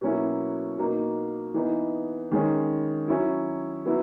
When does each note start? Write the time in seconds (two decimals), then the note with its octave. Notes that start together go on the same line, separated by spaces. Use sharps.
0.01 B2 F#3 A#3 C#4 E4
0.78 B2 A#3 D#4
1.54 E3 B3 D#4
2.31 D#3 G#3 C#4
3.08 F#3 C#4 E4
3.86 F#3 B3 E4